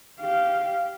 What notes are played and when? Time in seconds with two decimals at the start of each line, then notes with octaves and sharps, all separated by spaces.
0.21 G4 F5